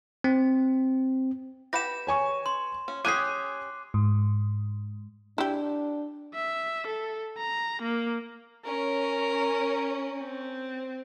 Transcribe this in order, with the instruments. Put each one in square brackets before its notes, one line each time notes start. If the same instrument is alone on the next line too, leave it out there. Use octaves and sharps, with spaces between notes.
[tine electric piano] C4
[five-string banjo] G4 B4 F#5 [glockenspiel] A#6 E7
[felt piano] C#5 G#5 C#6
[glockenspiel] C6
[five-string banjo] C#4
[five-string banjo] C#4 G4 G#5 [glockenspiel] D6 C7 [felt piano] D#6 F#6 D#7
[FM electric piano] G#2
[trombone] D4 [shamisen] E4 G4
[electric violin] E5
A4
A#5
A#3
[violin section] C#4 [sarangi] A#4
[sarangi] C4